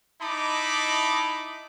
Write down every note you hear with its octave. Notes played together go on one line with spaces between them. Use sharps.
D#4 E4 D#5 A5 B5 D6